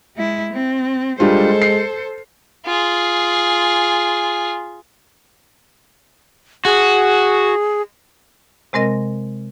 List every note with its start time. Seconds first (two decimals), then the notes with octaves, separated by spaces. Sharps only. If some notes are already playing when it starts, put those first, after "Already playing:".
0.16 G#3 E4
0.52 C4
1.20 G3 G#3 D4 F4 A4 C5
1.62 C7
2.66 F4 G#4
6.65 F#4 G#4
8.73 C3 G#3 C4 A#4 D#5 A#6